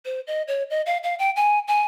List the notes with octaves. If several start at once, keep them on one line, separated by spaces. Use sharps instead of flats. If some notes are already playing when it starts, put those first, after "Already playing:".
C5
D#5
C#5
D#5
F5
F5
G5
G#5
G#5